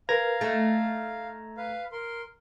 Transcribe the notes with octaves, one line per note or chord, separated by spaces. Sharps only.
A#4 B4 F5 A#5 G#6 A#6
A3 D#4 A4 A6
B4 F5
A#4 C6